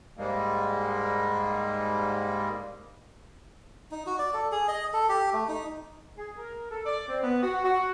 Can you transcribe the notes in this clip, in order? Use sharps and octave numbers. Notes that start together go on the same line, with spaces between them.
G#2 G3 G#3 A#3
D#4
F#4
D5
A4
G#4
D#5
A4
G4
A3
D#4
G#4
A#4
A4
D5
C4
B3
F#4
F#4